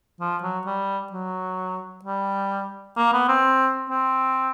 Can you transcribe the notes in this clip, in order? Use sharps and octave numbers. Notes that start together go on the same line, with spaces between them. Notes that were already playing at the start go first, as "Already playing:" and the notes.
F3
F#3
G3
F#3
G3
A#3
B3
C4
C4